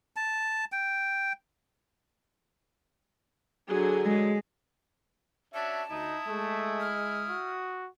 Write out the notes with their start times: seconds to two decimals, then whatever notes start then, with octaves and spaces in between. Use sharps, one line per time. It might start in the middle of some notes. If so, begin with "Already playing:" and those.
0.16 A5
0.72 G5
3.67 D3 F#3 G#4
4.04 G#3
5.54 C#4 D4 F#4 E5 A5
5.90 D2 D#4 E4 D#6
6.28 G#3 A3
6.80 F6
7.30 F#4